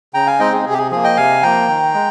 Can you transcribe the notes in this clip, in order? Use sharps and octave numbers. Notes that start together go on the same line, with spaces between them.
C#3 G5 A#5
F5 G#5
G#3 C4 D#4 D#5 G5
G#4
C3 G#4
G4
G#4
F3 A#3 G#4
D#5 G5
C3 F5 G#5
F3 A#3 G5 A#5
D#3
G#3